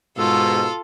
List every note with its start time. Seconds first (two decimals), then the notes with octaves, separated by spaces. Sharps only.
0.17 G#2 B2 F4 A4 E6